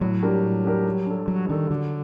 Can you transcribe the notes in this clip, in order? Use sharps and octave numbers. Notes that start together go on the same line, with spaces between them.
A2 F#3
G3 D4 G4 A#4
A2
G3 D4 G4 A#4
G3
D4 A4
F#3 G3
D#3 D4 A4
D3 F#3